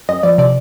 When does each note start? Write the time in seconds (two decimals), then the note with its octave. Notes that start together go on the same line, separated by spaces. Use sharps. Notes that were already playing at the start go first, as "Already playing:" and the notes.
0.09 F#2 D#5
0.23 F3 D5
0.38 C3 D5